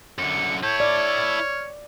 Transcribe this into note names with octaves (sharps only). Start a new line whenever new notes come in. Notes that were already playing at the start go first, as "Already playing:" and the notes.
F#2 D3 C#7
E4 A4 C#5 G6
D5 F6